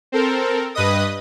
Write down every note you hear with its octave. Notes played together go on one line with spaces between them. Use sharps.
C4 A4 A#4
G2 B4 D#5 D#6